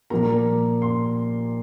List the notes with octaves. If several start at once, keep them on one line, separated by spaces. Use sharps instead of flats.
A#2 F3 A#3 A#5
C6